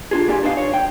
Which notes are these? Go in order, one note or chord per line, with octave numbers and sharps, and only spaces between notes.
D4 F4 G#4
B1 A#3 G4 D5 G#5
B3 D4 D#4 D5 F5
C#5
F#2 G5